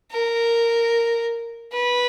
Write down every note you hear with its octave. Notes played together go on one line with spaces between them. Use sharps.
A#4
B4